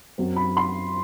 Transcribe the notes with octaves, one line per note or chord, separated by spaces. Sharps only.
F#2 F#3 C4
B5
C6